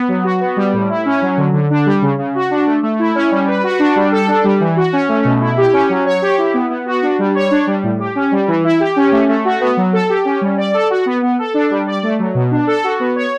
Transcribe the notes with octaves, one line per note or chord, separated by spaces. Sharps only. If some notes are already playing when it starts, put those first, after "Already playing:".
Already playing: B3
F#3
F#4
B3
G3
A2
E4
C#4
F#3
D3
D3
D4
G3
C#3
C#3
F#4
D4
A3
A3
E4
C#4
G3
B4
F#4
D4
G3
A4
D4
G3
E3
F#4
C#4
A3
B2
E4
G4
C#4
F#3
C#5
G4
E4
B3
B3
F#4
D4
G3
C#5
D4
G3
A2
G4
C#4
G3
E3
E4
G4
C#4
A3
A3
F#4
B3
F#3
A4
G4
C#4
G3
D5
A4
F#4
B3
B3
A4
D4
G3
D5
A3
F#3
B2
D4
A4
F#4
B3
C#5